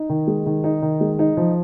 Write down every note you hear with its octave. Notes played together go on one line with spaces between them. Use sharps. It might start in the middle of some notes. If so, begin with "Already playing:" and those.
Already playing: D#4
D#3
G#3
D#3
D#4
D#3
G#3
D#4
F3